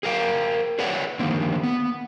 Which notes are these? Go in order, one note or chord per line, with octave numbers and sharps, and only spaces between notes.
G#4 A#4 F5 G5
G#4 B4 C#5 D5 F#5
D3 D#3 F3 A#3
B3